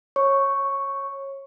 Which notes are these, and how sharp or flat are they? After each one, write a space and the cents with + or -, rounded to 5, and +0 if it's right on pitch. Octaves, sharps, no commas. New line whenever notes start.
C#5 -20 C#6 +0